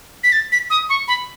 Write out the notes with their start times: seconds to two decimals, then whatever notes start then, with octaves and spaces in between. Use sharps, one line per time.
0.24 B6
0.32 A6
0.52 B6
0.70 D#6
0.89 C#6
1.08 B5